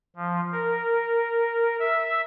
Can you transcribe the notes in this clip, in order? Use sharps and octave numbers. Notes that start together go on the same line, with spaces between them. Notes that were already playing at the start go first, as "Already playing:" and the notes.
F3
A#4
E5